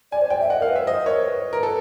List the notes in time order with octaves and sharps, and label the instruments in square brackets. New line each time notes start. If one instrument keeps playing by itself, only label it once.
[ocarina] D5 [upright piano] G#5
[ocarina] C5
[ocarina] D5 [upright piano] G5
[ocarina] E5
[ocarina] D#5 [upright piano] F#5
[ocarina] A#4 [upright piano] F5
[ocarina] B4
[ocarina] C5 [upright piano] E5
[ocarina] C5 [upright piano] D#5
[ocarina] A#4 [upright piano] C#5
[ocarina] B4
[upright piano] A#4
A4